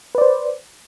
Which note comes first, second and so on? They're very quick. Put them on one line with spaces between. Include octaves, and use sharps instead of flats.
B4 D5 C5